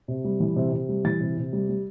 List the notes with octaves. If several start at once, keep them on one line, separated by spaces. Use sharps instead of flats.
C3
G3
E3
C3
C3
G3
E3 A6
C3
C3
G3
G3